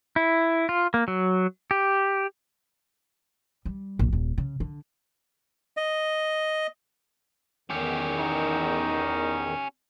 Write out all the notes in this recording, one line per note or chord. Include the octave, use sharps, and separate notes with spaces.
E4
F4
A#3
F#3
G4
G3
A#1
D#1
C#3
D3
D#5
E2 D#3 C#4 G4
D#4